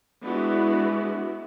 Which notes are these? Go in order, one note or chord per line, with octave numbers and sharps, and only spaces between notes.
G#3 B3 D4 E4 F#4